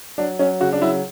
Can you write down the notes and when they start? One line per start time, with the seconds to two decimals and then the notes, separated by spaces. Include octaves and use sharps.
0.18 F#3 D4
0.39 F#3 C#4
0.60 C#3 F#4
0.73 D4
0.81 F#3 E4